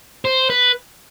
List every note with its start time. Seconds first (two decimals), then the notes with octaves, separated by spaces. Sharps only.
0.25 C5
0.50 B4